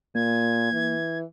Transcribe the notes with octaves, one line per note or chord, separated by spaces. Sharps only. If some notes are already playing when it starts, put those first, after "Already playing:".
A#2 A#3 G#6
E3